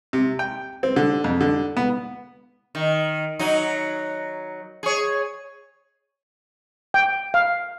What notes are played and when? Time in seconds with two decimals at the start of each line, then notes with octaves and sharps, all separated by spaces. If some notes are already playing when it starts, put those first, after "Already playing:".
0.13 C3
0.39 G5
0.83 C4
0.96 D3
1.24 F2
1.41 D3
1.77 B3
2.75 D#3
3.39 F#3 D#4
4.83 G#4 C#5
6.94 G5
7.34 F5